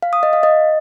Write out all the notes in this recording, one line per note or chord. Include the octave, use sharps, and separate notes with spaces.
F5
D#6
D#5
F5
D#5